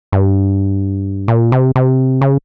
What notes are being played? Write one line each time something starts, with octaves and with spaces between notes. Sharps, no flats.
G2
A#2
C3
C3
C#3